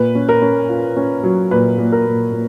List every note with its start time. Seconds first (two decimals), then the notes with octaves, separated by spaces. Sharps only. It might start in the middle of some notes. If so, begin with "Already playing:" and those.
Already playing: A#2 B4
0.15 C#4
0.29 A#4
0.42 C#4
0.69 F4
0.97 C#4
1.23 F#3
1.51 A#2 B4
1.78 A#2
1.92 A#4
2.05 A#2
2.32 A#2